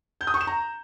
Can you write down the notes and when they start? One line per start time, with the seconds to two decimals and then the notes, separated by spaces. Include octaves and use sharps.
0.21 G6
0.27 D#6
0.34 C#6
0.41 E7
0.47 A#5